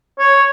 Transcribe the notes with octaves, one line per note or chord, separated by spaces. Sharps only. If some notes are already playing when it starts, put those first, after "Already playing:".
C#5